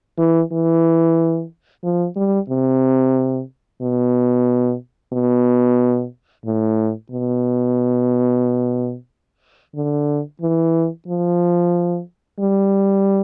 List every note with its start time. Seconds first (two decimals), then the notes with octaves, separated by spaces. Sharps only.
0.18 E3
0.52 E3
1.83 F3
2.16 G3
2.49 C3
3.81 B2
5.13 B2
6.45 A2
7.11 B2
9.75 D3
10.41 E3
11.08 F3
12.39 G3